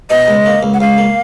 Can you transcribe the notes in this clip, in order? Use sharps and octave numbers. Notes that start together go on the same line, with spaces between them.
B2 D#5
C#2
A#3
C#2
F#5
C#2 F5
A#3